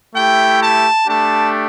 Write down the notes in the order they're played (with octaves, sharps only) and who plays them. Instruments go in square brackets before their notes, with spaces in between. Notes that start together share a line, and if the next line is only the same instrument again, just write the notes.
[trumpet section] A3 E4 G4 G5
A5
A3 D4 G4 A5